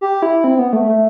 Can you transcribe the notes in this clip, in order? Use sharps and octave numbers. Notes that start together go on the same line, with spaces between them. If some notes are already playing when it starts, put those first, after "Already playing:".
G4
E4
C4
B3
A3
A3